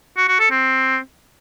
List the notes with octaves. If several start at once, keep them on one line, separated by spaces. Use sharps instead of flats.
F#4
F#4
A4
C4